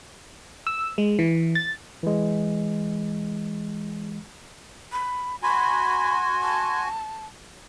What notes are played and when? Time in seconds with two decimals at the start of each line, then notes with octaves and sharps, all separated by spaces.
0.67 E6
0.98 G#3
1.19 E3
1.55 A6
2.03 E3 G#3
4.92 B5
5.43 F#4 G#5 B5 C6
6.43 A5